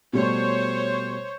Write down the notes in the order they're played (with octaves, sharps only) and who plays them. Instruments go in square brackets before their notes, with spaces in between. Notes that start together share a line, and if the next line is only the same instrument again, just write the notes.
[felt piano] B2 G3 A3 [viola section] C5 C#5